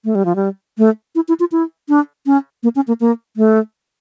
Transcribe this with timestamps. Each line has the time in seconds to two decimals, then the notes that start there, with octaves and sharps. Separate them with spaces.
0.05 A3
0.15 G3
0.25 F3
0.36 G3
0.78 A3
1.15 E4
1.28 E4
1.40 F4
1.52 E4
1.89 D4
2.26 C#4
2.63 A#3
2.75 C#4
2.88 A#3
3.00 A#3
3.37 A3